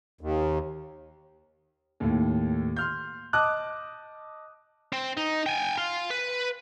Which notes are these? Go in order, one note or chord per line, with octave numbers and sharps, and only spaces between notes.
D#2
D#2 A2
C6 F6 G6
D#5 A5 D6 D#6 F#6
C4
D#4
G5 G#5
F4
B4